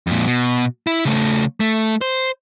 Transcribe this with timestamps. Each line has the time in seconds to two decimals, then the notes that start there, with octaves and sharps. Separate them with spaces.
0.07 F2 A#2
0.27 B2
0.87 E4
1.05 C#3 A3
1.60 A3
2.01 C5